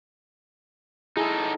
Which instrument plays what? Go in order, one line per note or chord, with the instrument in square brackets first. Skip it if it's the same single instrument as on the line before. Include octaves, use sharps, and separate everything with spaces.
[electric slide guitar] D#4 A4 [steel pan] E4 G#4